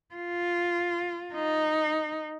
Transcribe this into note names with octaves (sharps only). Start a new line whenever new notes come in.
F4
D#4